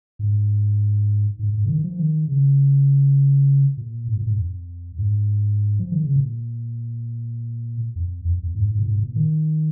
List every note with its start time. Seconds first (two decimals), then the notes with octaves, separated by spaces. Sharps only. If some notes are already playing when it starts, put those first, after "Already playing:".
0.19 G#2
1.39 G#2
1.53 G#2
1.65 C#3
1.68 D#3
1.84 F3
1.99 D#3
2.28 C#3
3.77 A#2
4.08 G#2
4.17 A#2
4.27 G#2
4.38 F2
4.98 G#2
5.79 F3
5.92 D#3
6.04 C#3
6.16 A#2
7.96 F2
8.25 F2
8.43 F2
8.55 G#2
8.71 G#2
8.79 A#2
8.86 G#2
9.00 A#2
9.16 D#3